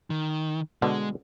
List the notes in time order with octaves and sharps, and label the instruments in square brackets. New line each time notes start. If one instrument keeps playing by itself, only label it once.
[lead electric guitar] D#3
[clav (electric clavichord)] B2 D3 [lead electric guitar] G#3